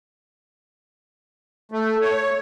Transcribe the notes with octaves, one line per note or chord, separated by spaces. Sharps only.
A3
C#5